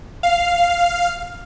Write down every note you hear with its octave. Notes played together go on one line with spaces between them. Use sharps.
F5